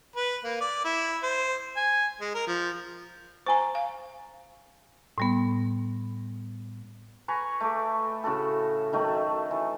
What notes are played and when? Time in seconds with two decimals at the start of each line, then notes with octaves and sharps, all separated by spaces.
0.16 B4
0.44 A#3
0.61 D5
0.85 E4
1.23 C5
1.77 G#5
2.21 G#3
2.34 A#4
2.47 F3
3.46 C5 G#5 A#5 C#6
3.75 F5
5.18 A2 G3 B3
7.28 B4 G#5 A#5 C#6
7.60 A3 D6
8.24 A2 C#3 F#4 A4
8.93 D#3 F#3 A3
9.51 E3